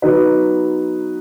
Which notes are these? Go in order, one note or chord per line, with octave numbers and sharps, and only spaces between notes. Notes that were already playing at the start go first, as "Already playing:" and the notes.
F#3 B3 D#4 B4